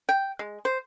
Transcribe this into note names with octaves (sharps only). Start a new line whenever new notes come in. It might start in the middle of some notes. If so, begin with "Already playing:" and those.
G5
G#3
C5